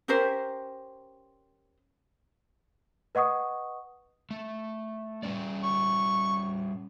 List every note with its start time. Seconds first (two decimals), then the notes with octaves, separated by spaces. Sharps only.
0.08 C#4 G4 A#4 C5
3.15 B4 D#5 F#5 C#6 D#6
4.31 A3
5.23 G3 C#4 D5
5.64 C#6